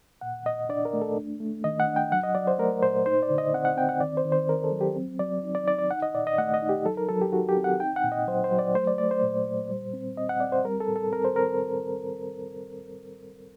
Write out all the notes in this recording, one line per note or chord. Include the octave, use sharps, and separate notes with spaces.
A#2 F#5
A#2 D#5
D4 D5
A#4
A3
A4
D4
A3
D#3 D#5
F#5
D4
G5
F#3 F#5
D#5
F#3 D5
C5
A3 A#4
A#2 C5
D#4 C5
D5
D3
D#5
C4 F#5
F#5
C4 G5
F#5
D#3 D5
C5
D#3
C5
D#3 A#4
A4
F#3
G4
C4
F#3 D5
D#4
D5
D#4 D5
D5
D#4 F#5
D#5
A#2 D5
D#5
A3 F#5
D#5
D#4
G4
F#3 A4
A#4
F#3 A4
G4
D#4 F#4
G4
C4
F#5
D#4 G5
F#5
A#2
D#5
F#3 C5
C5
F#3
D5
A3 C5
D5
A3 D5
C5
A#2
A#2
G3
C4
C4 D#5
F#5
C4 D5
C5
G3 A#4
A4
A2
A4
C4 A#4
C5
C4 A#4